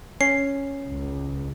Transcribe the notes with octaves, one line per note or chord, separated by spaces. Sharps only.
C#4 C7
C#2